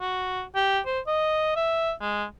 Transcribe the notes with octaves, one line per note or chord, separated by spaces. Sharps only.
F#4
G4
C5
D#5
E5
G#3